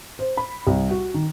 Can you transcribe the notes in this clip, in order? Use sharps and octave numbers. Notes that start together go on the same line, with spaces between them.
C5
B5
C2
F#4
D#3